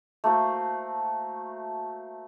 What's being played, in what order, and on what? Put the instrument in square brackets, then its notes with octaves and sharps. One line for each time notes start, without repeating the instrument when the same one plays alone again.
[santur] A3 A#3 F#4 C5